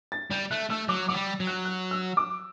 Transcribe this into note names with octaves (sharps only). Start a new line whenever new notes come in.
A6
G3 G6
A3 F#6
A3 E6
F#3 D6
F#3 D6
G3
F#3
F#6
F#6
E6
D6